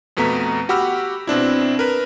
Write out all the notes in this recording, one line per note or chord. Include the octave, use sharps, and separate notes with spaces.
F2 B2 A3 B3 A#5 B6
F#4 G4 F#5 B5 E6 F6
B2 C4 D4 E4
A#4 B4